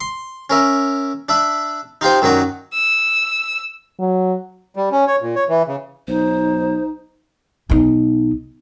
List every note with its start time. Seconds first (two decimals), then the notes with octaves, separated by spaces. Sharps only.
0.01 C6
0.50 C#4 A#4 E5
1.29 D4 D5 E5 B5
2.01 D#4 F4 G4 C5
2.22 F#2 D#3 F#3 F#4 D5
2.74 E6
3.99 F#3
4.76 G3
4.91 C#4
5.07 C#5
5.22 A#2
5.36 C#5
5.49 E3
5.68 C#3
6.08 B1 D#4 C5
7.70 B1 D#4